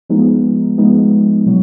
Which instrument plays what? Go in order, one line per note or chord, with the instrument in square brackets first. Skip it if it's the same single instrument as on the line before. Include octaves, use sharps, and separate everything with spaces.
[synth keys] F3 G#3 B3 D#4
F3 G#3 B3 D#4
B2 F#3